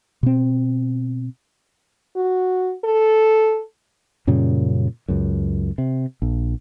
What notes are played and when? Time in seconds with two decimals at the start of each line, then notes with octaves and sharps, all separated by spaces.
0.23 B2 C4
2.16 F#4
2.84 A4
4.27 F#2 A#2 C#3 G3
5.08 C#2 F#2
5.78 C3
6.22 A#1